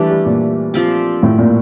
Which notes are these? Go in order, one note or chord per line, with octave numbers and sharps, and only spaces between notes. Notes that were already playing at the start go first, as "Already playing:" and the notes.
Already playing: E3 G3 A3 D4 G4
G3
A#2
F3 C4 G4
A2
A#2